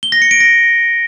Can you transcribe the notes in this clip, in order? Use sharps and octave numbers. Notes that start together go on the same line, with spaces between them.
G7
A#6
C#7
D7
A#6